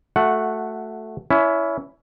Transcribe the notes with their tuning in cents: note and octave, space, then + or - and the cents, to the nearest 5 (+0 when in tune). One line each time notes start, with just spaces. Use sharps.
A3 +0 F#4 -15 F#5 +0
C#4 +25 E4 +0